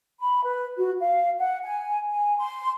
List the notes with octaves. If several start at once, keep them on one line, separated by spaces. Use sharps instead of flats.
B5
B4
F#4
F5
F#5
G#5
G#5
C6